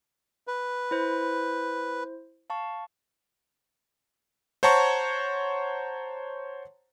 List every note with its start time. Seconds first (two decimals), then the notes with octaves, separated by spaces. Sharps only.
0.47 B4
0.91 E4 C5
2.50 F5 A5 C#6
4.63 C5 C#5 F#5 A5 A#5 C#6